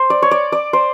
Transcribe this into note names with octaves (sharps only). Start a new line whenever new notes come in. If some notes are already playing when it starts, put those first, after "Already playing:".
Already playing: C5
D5
C#5
D5
D5
C5